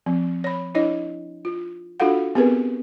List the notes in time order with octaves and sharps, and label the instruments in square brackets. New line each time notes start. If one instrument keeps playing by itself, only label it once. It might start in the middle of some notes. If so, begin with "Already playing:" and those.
[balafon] F3 C4
C#5 B5
D4 E4 C#5 D#5
F4
D4 F4 F#4 A4 F5 F#5
B3 C4 G4 G#4 A#4 B4